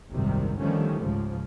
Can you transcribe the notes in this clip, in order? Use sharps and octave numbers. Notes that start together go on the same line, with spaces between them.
F#1 C2 G#2 C3 D#3 G3
D3 D#3 F3 G3 A3 C#4
C#2 G#2 F3